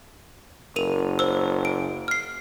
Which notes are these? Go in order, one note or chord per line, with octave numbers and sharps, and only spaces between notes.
F#1 A#4 D#7 F7
C5 E6
D7
F6 C7